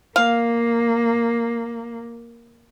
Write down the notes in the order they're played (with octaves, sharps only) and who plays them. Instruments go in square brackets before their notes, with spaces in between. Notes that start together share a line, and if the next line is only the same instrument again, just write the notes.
[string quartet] A#3 [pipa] F5